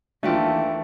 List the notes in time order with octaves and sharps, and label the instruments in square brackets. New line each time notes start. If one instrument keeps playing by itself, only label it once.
[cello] D#2 E3 [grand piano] A3 [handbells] D4 E5 G5 [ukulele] F4 F#4